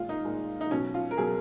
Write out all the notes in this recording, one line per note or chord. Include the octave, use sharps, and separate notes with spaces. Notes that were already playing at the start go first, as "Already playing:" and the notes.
Already playing: A#2 G#3 F4
D#4
A#2 G#3
D#4
B2 F#3 C#4
F4
A#4
B2 F#3 G#4